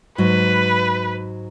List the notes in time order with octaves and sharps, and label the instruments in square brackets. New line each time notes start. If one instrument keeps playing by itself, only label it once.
[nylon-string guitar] G#2 F#3 [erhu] B4